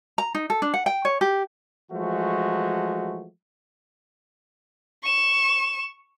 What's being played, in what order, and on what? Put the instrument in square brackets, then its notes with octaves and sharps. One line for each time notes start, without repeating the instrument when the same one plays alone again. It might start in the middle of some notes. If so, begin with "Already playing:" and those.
[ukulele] A#5
D#4
A4
D4
F#5
G5
C#5
G4
[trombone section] E3 F3 G#3 A3 F#4
[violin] C#6 E7